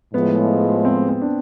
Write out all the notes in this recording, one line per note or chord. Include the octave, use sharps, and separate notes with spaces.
A2 F3 G#3 B3
C4
C4
D4